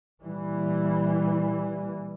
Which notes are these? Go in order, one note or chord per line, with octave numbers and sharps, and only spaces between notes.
A#2 E3 G3